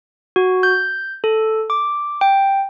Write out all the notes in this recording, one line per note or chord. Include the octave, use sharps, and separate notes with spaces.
F#4
G6
A4
D6
G5